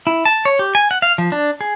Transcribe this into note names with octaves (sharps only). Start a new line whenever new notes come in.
E4
A5
C#5
G4
G#5
F#5
F5
F3
D4
G#4